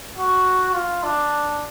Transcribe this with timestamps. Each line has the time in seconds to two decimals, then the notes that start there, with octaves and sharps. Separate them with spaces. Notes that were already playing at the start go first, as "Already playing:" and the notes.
0.18 F#4
0.75 F4
1.04 D4